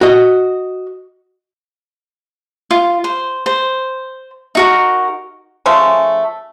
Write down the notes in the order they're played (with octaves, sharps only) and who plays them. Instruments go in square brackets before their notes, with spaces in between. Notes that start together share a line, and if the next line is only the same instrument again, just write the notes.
[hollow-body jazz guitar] F#4 D#5
[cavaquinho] F4
C5
C5
D#4 F#4 A#4
[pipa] F3 G#3 A3 C#4